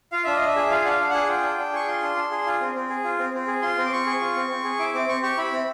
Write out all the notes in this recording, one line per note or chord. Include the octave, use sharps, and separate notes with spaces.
F4 F5
D4 E5
D#5
D4
E5
G#4
F4 F5
D4 F#5
F5
D4
G#4 F#5
F4 G5
D4
D4
G#4 C#6
F4 C6
D4
D4
G#4
F4
C4
C4
G#4
F4
C4
C4
G#4
F4 C6
C4
D6
C4 C#6
G#4
F4
C4
C4
G#4
E4 D6
C4 D6
C4 C#6
G4 C#6
E4 B5
C4